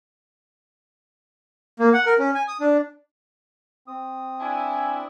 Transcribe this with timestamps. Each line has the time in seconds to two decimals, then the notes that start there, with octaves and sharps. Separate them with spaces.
1.79 A#3
1.93 F#5
2.06 A#4
2.19 C#4
2.35 G#5
2.48 D#6
2.60 D4
3.88 C4 D#6
4.40 D4 E4 G#5